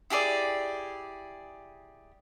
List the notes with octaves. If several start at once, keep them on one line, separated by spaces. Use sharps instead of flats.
E4 G4 G#4 D5